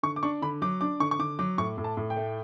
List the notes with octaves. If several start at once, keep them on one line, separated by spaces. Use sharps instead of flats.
D3 C#6
D6
D4 C#6
D3 B5
F#3 D6
D4 D6
D3 C#6
C#6
D3 D6
F#3 D6
A2 C#6
A2
A5
A2
G5
A3